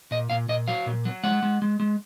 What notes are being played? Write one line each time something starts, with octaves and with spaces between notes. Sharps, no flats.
A#2 D#5
A#2 F5
A#2 D#5
F#3 F5
A#2
F#3
G#3 F#5
G#3
G#3
G#3